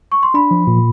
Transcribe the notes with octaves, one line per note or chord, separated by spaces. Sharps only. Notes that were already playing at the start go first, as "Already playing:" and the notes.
C#6
C6
D4 B5
F3
A#2